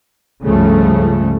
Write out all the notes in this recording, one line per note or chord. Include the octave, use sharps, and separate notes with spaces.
C#2 G2 C#3 F3 G3 A3